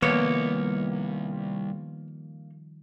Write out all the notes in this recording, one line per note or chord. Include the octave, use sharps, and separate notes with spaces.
C2 D#3 F3 G3 A#3 B3 C#5